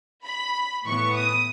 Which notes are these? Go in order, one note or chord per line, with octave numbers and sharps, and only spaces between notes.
B5
A2 E3 B3 C#6
D#6